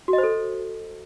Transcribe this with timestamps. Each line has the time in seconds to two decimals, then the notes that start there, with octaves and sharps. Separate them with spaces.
0.08 F#4
0.13 D#5
0.18 C5
0.23 A4